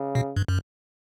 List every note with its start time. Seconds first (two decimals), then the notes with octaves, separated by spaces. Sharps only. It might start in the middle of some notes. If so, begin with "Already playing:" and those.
Already playing: C#3
0.15 B2
0.36 G2
0.48 F#2